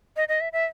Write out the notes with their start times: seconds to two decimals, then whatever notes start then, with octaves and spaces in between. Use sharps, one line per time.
0.16 D#5
0.28 D#5
0.41 E5
0.53 E5